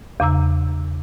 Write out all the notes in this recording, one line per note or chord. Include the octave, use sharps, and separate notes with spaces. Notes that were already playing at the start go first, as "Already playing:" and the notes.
E2 C#3 A#5 E6